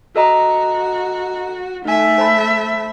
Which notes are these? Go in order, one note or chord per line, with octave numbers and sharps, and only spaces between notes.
F#4 A4 D#5 A#5
A3 D#4 E5 G#5
C5 A5 B5